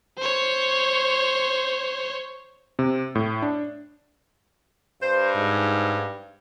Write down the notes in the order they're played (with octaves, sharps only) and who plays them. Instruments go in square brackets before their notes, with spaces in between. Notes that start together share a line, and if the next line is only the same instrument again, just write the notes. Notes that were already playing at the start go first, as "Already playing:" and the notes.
[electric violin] C5 C#5
[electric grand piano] C3
A2
D4
[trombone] G2 [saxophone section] C5
[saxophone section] G#2